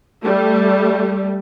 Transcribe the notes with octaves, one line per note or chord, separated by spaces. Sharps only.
G3 A3